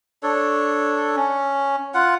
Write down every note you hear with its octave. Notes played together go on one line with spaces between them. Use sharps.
D4 A4 C#5
C#4
F4 F#5